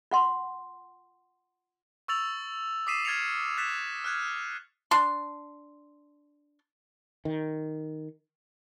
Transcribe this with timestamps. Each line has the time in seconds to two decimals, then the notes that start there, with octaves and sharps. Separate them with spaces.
0.11 F4 F#5 C6
2.08 C#6 E6 A6 F7 F#7
2.87 D6 D#6 B6 C7 D#7 E7
3.05 F6 G#6 A6 C7 C#7 F7
3.58 F#6 A6 B6 E7
4.04 F6 F#6 G#6
4.91 D4 C6
7.25 D#3